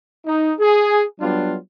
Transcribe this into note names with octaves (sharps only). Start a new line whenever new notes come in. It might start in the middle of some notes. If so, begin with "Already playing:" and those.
D#4
G#4
F#3 G3 B3 D4 F4